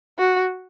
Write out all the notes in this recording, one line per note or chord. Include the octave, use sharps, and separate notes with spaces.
F#4